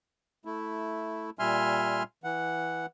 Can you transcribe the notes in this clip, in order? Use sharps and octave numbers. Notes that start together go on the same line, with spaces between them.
A3 E4
A#2 G3 E5 G#5 C6 F6
E3 F#5